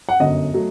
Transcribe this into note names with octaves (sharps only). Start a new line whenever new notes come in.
F#5
G1 F#2 D3 D#5
F#3 A3